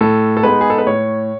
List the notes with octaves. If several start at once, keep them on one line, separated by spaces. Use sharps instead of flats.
A2 A4
A4
G#3 B3 D#4 B4
G#4
A4
B4
A2 C#5